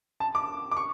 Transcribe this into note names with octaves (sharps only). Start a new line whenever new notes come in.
A5
D6
D6
C#6